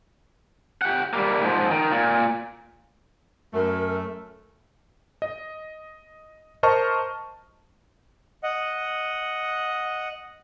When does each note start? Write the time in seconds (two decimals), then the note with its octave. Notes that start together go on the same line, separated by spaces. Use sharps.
0.82 G4 F#5
1.13 G3 A#3
1.43 G#2 F3
1.71 D#3
1.91 A#2
3.54 F#2 A3 A#4
5.22 D#5
6.63 A#4 C5 D#5 A5 C#6 F6
8.43 D#5 F#5